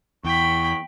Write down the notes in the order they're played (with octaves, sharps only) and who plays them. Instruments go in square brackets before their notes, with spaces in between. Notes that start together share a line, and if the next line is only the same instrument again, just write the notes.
[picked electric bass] E2 [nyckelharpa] G5 B5 [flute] C#6